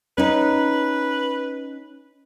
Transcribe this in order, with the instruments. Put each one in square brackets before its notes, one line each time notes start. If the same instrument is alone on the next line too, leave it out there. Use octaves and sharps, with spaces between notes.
[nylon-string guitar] C#4 D#4 [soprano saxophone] B4